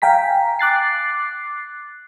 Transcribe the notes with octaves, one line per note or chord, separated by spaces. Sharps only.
F5 G5 G#5 A#5 B6
D6 F#6 A6 C7